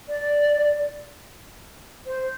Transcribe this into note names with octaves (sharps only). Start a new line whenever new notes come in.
D5
C5